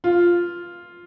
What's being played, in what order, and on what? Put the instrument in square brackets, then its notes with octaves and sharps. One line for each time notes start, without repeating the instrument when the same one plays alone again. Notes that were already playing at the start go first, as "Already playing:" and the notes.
[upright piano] F4